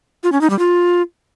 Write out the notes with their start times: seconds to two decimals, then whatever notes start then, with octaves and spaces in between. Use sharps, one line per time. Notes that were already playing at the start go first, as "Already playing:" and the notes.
0.23 F4
0.32 C#4
0.41 D#4
0.50 G3
0.59 F4